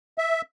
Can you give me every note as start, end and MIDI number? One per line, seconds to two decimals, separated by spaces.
0.18 0.42 76